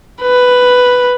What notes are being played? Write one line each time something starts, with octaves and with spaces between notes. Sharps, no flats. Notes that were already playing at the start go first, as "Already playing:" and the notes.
B4